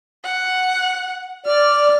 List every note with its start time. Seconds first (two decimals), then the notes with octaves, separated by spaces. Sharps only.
0.24 F#5
1.46 D5 F6